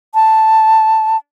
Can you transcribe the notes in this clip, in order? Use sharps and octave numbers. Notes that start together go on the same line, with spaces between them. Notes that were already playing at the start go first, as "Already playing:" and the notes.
A5